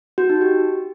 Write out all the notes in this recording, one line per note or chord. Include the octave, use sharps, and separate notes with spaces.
F#4
D#4
G4